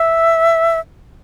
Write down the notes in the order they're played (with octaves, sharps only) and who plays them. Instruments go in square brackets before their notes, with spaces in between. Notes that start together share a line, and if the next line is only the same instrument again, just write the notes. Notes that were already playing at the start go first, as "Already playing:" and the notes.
Already playing: [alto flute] E5